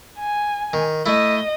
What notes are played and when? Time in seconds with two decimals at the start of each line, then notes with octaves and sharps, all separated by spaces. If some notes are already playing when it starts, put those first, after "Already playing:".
0.19 G#5
0.73 D#3
1.06 A3 E4 D#5